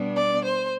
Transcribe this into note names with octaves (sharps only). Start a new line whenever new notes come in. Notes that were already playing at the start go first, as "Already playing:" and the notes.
Already playing: B2 G3 B3 D4
D5
C5